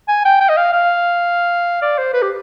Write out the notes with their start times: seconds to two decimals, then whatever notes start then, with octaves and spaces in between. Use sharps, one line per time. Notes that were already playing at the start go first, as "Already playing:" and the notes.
0.08 G#5
0.25 G5
0.41 G5
0.49 D#5
0.57 F5
0.72 F5
1.82 D5
1.98 C5
2.14 B4
2.22 G4